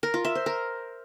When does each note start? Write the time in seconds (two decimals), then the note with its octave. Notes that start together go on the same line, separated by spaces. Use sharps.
0.03 A#4
0.14 F4
0.25 E5
0.35 C5
0.46 A#4